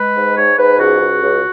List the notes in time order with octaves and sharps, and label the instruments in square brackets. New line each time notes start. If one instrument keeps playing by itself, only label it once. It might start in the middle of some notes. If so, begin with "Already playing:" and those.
Already playing: [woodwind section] G#3 B4
G#2
G#2 C#5
G#2 B4
C#2 F#4
C#2
C#2